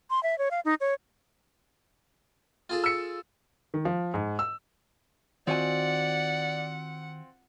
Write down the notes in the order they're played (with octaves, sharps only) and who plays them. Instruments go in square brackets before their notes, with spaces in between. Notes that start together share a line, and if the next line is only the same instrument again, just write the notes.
[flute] C6
E5
C#5
F5
D#4
C#5
[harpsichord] F4 G#4 A4
[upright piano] E6 C#7
[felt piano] D#3
F3
G#2
E6
[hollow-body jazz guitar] D#3 F#4 G#5 [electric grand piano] C4 F4 [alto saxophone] D5 [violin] F#5